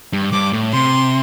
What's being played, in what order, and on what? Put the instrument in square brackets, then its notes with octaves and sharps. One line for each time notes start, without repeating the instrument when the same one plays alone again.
[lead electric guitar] G2
[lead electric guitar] G2 [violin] D6
[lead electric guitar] A2
[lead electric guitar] C3 [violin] C6